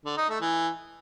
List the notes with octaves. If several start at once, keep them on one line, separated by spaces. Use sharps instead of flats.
D3
D#4
A3
E3